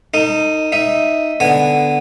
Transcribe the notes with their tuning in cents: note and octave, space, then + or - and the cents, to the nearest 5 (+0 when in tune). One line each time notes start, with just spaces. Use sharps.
D#4 +0 A4 +45
D#4 +0 E5 +0
D3 +0 B3 +0 G#5 -15